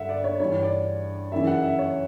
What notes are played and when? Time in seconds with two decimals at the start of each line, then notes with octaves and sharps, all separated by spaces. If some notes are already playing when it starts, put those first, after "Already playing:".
Already playing: G2 D3 E5 F#5
0.09 D5
0.24 C#5
0.40 G2 E3 C#5
0.63 D5
1.32 F#2 C#3 E3 E5
1.47 F#5
1.63 E5
1.79 C#5